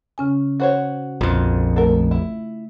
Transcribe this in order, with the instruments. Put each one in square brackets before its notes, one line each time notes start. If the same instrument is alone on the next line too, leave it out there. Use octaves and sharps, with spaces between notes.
[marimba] C#3 C#4 G#5
[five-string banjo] F#4 C5 C#5
[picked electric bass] A#1 F2 [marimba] F4 C6
[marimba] A3 [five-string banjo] A4 A#4
[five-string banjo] E4